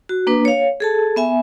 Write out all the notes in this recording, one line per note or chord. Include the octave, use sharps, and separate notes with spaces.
F#4
A#3 D4 B4
C#5 F5
G#4 A4 A5
B3 E5 G#5